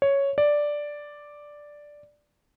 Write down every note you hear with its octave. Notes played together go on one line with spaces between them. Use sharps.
C#5
D5